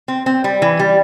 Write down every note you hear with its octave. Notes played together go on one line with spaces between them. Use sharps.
C4
C4
G3
E3
G3